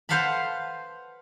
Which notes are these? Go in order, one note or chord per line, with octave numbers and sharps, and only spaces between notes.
B4 C5 F5 F#5 A5 B5